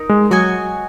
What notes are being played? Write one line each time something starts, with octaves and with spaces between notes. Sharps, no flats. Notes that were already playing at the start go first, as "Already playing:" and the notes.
Already playing: D#4 A#4
G#3
F#3 F#4 D#5 G#5